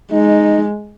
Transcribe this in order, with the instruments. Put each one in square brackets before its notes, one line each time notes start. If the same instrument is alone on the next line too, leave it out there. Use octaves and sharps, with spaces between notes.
[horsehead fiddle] G#3 [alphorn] D#4